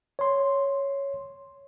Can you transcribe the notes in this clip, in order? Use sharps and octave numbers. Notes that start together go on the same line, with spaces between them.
C#5 C6